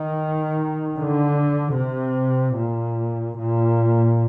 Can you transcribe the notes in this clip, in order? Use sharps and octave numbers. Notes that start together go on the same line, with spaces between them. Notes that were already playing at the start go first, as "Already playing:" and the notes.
Already playing: D#3
D3
C3
A#2
A#2